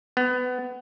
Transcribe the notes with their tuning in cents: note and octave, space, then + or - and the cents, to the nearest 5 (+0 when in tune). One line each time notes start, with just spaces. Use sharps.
B3 +20